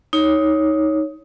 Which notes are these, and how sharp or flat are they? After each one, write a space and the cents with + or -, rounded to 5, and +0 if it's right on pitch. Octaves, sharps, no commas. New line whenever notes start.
D#4 +15 C#5 +0